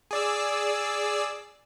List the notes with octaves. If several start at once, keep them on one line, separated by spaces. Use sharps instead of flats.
G#4 D5 E6